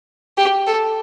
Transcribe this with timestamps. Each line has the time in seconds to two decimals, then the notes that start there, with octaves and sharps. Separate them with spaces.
0.37 G4
0.67 A4